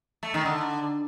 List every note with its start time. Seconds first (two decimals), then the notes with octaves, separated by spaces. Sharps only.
0.23 A3
0.34 D#3
0.45 D3